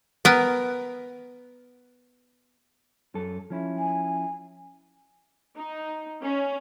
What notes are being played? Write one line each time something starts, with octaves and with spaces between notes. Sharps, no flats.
B3 A#4
F#2 A4
F3 C#4 E4
G#5
D#4
C#4